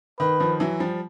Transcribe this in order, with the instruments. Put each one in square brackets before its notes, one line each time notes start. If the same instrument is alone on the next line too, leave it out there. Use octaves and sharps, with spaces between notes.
[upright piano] D#3 [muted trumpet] B4
[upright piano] D#3 F3
E3 F#3
F3 G3